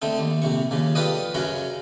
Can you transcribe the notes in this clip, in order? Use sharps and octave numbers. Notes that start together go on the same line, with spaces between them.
D3 A3 C4 D#4
D#2
A#1 C3 C#6
D#2 C#3 F3
F4 G4 A4 B4 D5 D#5
F#2 C#3 F#3 C#4 F#4 A#5